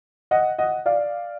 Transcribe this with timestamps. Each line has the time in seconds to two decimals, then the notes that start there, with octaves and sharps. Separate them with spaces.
0.31 D#5 F#5
0.59 D#5 F#5
0.86 D5 F5